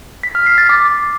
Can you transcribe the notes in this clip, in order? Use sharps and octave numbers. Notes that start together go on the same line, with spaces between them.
B6
F6
C7
A6
D6